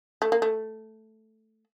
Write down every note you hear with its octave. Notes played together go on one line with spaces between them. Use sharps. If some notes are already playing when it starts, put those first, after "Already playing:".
A3
A#3
A3